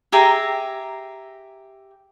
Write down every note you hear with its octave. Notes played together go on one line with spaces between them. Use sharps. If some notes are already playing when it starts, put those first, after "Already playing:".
G4 G#4 E5 A#5